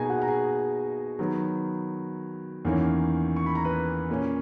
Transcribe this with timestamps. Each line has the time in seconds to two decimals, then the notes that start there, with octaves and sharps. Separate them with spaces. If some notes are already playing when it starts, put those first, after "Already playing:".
Already playing: B2 A#3 D#4 G#4 G#5 A#5
0.09 F#4 F#5
0.22 A#5
0.28 G#4 G#5
1.19 D#3 F#3 B3
2.65 E2 D#3 A#3 C#4
3.36 C#6
3.46 B5
3.55 A#5
3.65 B4 B5
4.09 A#2 A#3 C#4